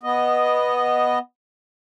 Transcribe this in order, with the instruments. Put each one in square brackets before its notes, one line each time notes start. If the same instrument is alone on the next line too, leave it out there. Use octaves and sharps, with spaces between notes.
[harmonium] B3 D#5